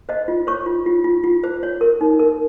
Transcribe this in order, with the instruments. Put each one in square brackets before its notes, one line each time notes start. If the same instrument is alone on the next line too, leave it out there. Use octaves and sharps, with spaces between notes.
[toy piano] C5 D#5
F4
C5 C#5 C#6
F4
F4
F4
F4
C5
C#5
A#4
D#4
A#4